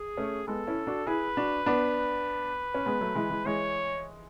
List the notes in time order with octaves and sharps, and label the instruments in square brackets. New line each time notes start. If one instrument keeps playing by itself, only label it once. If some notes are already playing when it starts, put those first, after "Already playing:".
Already playing: [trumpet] G#4
[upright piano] A3 C#4
[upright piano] G#3 B3 [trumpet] A4
[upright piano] C#4 E4
D4 F#4
[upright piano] E4 G#4 [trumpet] B4
[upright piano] D4 F#4
B3 D4
C#4
G#3 B3
F#3 A3
E3 G#3
E3 G#3
[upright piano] E3 G#3 [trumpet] C#5